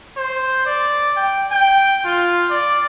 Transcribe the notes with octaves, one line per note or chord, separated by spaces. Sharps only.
C5
D5
G5
G5
F4
D5